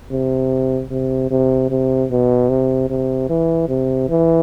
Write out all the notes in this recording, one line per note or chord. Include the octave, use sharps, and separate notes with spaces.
C3
C3
C3
C3
B2
C3
C3
E3
C3
E3